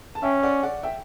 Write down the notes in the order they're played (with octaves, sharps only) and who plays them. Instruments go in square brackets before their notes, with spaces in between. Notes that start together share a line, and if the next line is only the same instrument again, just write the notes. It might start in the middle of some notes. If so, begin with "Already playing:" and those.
[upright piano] A5
[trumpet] C#4 [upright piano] E5 G5
[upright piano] D5 F#5
D5 F#5
E5 G5